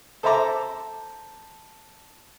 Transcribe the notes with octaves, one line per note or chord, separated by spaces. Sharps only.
A4 C5 E5 A5 A#5 D6